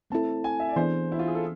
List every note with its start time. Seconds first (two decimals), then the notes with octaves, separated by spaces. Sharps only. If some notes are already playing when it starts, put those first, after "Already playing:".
0.10 A3 C4 E4 A4 A5
0.44 G#5
0.60 E5
0.69 D5
0.76 E3 B3 D4 G#4 C5
1.12 E4
1.19 F4
1.27 G#4
1.35 A4